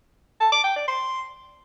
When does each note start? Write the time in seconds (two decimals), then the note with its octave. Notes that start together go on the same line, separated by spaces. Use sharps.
0.40 A5
0.52 D6
0.64 G5
0.76 D5
0.88 C6